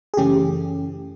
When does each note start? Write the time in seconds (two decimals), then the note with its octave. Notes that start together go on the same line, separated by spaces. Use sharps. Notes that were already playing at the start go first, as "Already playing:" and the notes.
0.14 G#4
0.17 F#2 C#3 E3 A3 C#4 G4